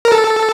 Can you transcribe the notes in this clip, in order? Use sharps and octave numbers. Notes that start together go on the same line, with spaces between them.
A#4
A4